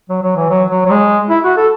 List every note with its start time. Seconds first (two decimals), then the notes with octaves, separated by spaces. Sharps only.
0.09 F#3
0.23 F#3
0.36 E3
0.50 F#3
0.71 F#3
0.86 F#3
0.91 G#3
1.30 E4
1.44 F#4
1.57 A4